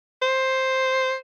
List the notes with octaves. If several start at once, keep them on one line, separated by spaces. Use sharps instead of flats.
C5